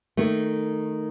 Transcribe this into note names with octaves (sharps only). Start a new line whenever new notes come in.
D#3 A3